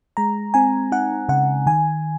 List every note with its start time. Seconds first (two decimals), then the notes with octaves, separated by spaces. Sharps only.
0.17 G#3 A#5
0.54 C4 G#5
0.92 D#4 F#5
1.29 C#3 F#5
1.66 D#3 G#5